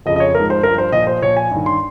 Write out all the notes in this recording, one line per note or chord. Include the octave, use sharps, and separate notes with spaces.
F2 C#3 F3 D#5
D#5
C#5
F3 A#4
G#2
C5
G2 F3 A#4
C5
A#2 F3 D#5
C5
A#2 F3 C#5
G#5
G2 D#3
C6